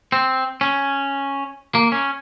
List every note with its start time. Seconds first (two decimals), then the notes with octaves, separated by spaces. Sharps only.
0.12 C4
0.61 C#4
1.75 A#3
1.92 C#4